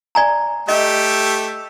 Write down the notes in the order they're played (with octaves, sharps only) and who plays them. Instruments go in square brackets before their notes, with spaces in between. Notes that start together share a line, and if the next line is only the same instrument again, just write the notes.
[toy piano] D5 G#5 A#5
[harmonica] A3 G4 E5 [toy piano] D#5